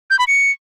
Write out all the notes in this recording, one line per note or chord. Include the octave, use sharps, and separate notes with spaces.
G6
B5
C#7